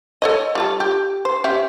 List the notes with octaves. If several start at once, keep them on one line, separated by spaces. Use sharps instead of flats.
A4 C#5 D#5
G3 F4 A4
G4
C5
C#4 G4 E5